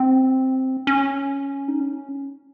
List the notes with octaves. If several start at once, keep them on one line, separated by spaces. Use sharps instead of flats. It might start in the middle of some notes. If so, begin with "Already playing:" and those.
Already playing: C4
C#4
D#4
C#4